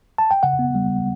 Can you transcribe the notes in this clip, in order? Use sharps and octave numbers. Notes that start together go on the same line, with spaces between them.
A5
G5
C#3 F#5
B3
G3